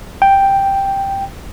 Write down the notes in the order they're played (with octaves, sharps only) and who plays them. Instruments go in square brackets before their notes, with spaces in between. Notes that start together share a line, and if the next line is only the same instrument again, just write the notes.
[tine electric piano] G5